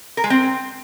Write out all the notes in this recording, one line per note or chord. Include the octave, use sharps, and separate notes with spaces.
A#4
G#3
C4